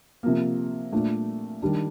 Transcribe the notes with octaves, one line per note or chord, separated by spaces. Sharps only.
C3 F3 A#3
A#2 A3 D4
D#3 G3 D4